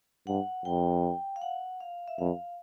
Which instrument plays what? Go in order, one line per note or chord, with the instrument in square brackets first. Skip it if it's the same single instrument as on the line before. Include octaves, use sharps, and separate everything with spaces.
[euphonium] G2 [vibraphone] F#5
[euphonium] F2 [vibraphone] G5
[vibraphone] F5
F#5
F5
E5
[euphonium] F2 [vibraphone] F5